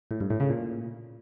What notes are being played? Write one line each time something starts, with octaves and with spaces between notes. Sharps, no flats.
A2
G2
A2
C#3
A#2